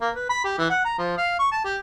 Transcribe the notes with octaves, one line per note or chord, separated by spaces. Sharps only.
A#3
B4
B5
G4
E3
F#5
A#5
F3
F5
C#6
A5
G4